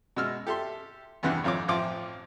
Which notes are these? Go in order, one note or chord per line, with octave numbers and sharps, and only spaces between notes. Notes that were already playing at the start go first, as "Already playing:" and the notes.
B2 G#3 E6 F6
G4 A4 E5 C6
E2 G2 C3 E3 G4 F#5
G#1 F2 F4 C#5 D6
A1 F3 C4 F4 D6